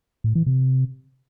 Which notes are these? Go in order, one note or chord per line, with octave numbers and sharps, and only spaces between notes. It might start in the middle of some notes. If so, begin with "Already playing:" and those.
A2
E3
C3